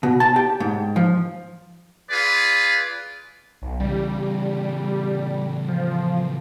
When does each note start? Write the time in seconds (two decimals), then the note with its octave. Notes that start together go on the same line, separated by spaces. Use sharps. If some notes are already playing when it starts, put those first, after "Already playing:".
0.03 B2
0.20 A5
0.36 G4
0.60 G#2
0.96 F3
2.11 F4 G#4 B4 D5
3.62 B1
3.80 C#3 E3 G3
5.68 F3